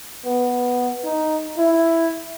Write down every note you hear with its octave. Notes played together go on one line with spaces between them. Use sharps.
B3
D#4
E4